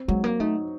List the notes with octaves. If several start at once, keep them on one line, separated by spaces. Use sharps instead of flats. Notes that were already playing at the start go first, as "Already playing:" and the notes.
Already playing: C4
F#3 G#3
A#3
A3 D#4